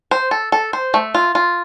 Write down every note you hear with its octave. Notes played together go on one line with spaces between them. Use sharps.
C5
A4
A4
C5
A3
F4
F4